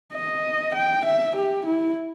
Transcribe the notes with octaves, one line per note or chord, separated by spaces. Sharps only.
D#5
G5
E5
G4
E4